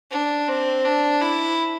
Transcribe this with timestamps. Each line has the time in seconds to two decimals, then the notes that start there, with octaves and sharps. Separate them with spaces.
0.11 D4
0.48 C4
0.85 D4
1.21 E4